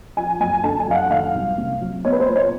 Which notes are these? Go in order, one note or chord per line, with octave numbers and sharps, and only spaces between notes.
F3 G#5
F#2 G#5
D3 A5
G#5
F#2 F5
F#5
D#3 F5
C2
C3
F#3
B3 C#5
B4
C5
A#2
C#5